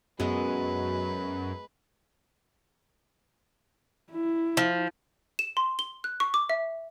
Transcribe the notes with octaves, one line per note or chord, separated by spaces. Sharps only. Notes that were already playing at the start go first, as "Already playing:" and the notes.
F#2 B2 G#3 B3 B4
E4
F3
E7
C6
G7
F#6
C#6
D6
E5